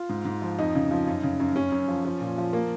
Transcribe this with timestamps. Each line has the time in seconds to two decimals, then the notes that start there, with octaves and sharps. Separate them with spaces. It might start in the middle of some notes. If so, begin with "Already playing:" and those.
Already playing: F4
0.09 G#2
0.25 G#2
0.42 F3
0.59 F2 D#4
0.75 C#3
0.91 F3
1.08 F#2
1.23 C#3
1.40 F#2
1.56 F#2 C#4
1.72 F#2
1.88 F3
2.05 F3
2.21 A#2
2.38 F3
2.53 A#3